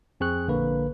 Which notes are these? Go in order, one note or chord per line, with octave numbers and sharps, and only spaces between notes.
F2 C4 G#4 C#6 F#6
A#1 D3 A#3 B4